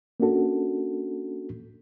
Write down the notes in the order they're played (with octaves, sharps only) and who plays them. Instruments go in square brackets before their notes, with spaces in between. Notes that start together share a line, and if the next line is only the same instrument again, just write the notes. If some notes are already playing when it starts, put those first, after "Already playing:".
[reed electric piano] A#3 C#4 D4 F#4 A4